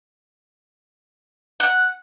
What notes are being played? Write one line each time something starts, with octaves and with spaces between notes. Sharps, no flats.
F#5